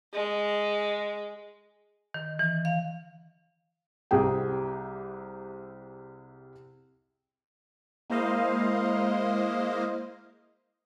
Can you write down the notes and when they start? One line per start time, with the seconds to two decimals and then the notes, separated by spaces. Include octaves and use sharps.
0.14 G#3
2.14 D#3
2.39 E3
2.65 F5
4.11 C2 C3 G3 G#4 G5
8.10 G#3 A#3 E4 C5 D#5 F5